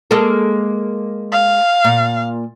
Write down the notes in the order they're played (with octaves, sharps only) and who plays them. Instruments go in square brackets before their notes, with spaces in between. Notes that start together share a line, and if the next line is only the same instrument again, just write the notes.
[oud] G#3 A#3 A4
[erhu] F5
[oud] A#2